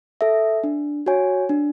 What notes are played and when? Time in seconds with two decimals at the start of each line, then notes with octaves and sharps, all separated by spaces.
0.21 A4 E5
0.64 D4
1.06 F#4 C#5 G#5
1.49 D4